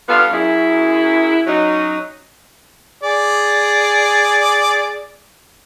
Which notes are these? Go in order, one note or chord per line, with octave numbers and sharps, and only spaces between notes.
G3 B3 D4 F4 A4 F5
F#2 E4 G#4
F#3 C#4 D#4
G#4 D5